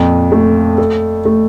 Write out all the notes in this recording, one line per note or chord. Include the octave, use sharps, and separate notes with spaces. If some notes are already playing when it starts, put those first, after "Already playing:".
Already playing: F2 A#2
A3
A4
A3